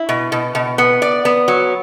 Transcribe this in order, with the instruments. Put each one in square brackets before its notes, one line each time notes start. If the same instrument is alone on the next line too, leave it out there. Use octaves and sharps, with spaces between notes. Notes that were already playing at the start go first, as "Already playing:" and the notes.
Already playing: [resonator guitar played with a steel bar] E4
B2
B2
B2
B3
D5
B3
F#3